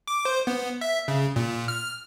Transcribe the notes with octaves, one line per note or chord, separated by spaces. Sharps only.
D6
C5
B3
E5
C#3
A#2
F6